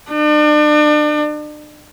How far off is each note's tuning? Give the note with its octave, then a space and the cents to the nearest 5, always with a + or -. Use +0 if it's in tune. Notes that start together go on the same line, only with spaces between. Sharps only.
D4 +35